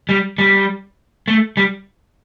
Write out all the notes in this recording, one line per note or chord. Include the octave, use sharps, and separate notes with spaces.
G3
G3
A3
G3